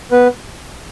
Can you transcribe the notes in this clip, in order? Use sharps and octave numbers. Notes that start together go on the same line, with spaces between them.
B3 B4